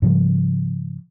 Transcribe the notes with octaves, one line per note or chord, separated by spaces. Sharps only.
G#2 C#3 F3 G3